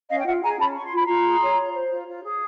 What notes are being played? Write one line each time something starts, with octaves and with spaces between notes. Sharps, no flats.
C#4 D#5 F5
G5
F4 E5 F#5
G#4 G#5 A#5
C#4 A5 B5
C#5 C#6
C6
F4 B5
F4 A#5 C6
G#4
C#5
F4
C5
F4
F4
G#4